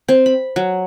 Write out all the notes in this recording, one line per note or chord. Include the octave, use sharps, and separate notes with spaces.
C4
B5
F#3